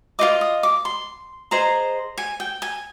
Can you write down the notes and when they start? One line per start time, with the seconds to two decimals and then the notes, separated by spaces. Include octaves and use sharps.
0.19 F4 C5 D#5 D6
0.41 D#6
0.63 D6
0.85 C6
1.51 G#4 C5 D#5 A#5
2.18 G#5
2.40 G5
2.62 G#5